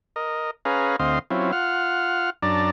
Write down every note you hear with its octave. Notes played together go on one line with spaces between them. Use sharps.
A#4 D#5
C#4 G#4 B4 F5 A#5
D2 C4 D#5 F5 C6
F#3 C4 C#4 E4 F4
F4 F#5 F6
F#2 D4 D5 A5 A#5